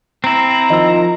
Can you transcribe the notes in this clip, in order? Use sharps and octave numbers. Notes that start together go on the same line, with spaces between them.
C4 E4 A#5
D#3 F3 D#5 E6